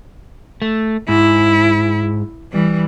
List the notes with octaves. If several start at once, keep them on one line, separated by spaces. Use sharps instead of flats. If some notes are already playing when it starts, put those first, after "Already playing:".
A3
G#2 E4
E3 G3